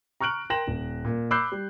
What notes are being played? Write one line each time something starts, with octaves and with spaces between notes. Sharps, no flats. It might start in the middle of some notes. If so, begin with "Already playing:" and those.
A#5 C#6 F6 F#6 D7 F#7
A#4 G5 C6 A#6 E7 F#7
D#1
A#2
B5 D6 E6 F#6 G6 C7
G3